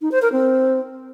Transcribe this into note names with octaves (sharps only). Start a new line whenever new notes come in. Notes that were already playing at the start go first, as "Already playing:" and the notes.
D#4
C5
A#4
C4